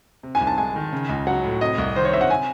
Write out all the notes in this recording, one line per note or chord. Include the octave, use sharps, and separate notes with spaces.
C3
G#5
C2
A5
G#3 G#5
D#3
C#3
C#2
F#3 F#5
A2
C3 D#5
C2
D#3 C5
C#5
C3 E5
F#5
C3 G#5